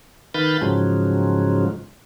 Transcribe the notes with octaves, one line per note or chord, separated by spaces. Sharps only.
D#3 B4 F5 B5 G6 A6
G#2 C#3 F3 F#3 G#3